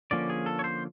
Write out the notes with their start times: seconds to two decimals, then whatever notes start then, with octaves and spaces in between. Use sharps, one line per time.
0.11 D3 F3 A#3 C#4 D5
0.30 G#4
0.46 A4
0.59 C#5
0.64 C5